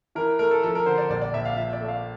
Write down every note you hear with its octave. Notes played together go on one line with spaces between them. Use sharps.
E3 A#4
A3 A#4
A4
F3 A4
A#4
D3 C5
D5
A#1 D5
D5
A#1 E5
F5
F3 E5
D5
A3
F5